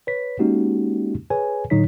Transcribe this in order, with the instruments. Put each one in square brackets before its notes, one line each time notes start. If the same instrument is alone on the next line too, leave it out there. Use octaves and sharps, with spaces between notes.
[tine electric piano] B4 C#5 B6
G#3 A#3 C#4 D#4 F#4 G4
G#4 B4 C#5 G#5
A2 D3 F#3 D#4 C#5 B6